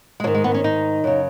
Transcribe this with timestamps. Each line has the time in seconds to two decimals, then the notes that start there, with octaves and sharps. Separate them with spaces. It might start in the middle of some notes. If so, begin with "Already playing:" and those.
0.20 G#3
0.24 G#2 D#3 F#3
0.35 G#3
0.44 B3
0.54 C#4
0.64 D#4
1.04 F#2 C#3